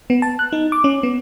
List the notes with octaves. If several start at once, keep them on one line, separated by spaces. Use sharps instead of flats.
B3
A5
F#6
D#4
D6
C#4
B3